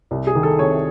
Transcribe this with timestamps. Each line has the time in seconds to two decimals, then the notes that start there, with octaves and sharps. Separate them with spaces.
0.11 C2
0.27 G#4
0.35 D#3
0.43 A4
0.59 C3 C#5